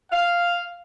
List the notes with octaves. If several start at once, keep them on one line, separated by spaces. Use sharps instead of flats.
F5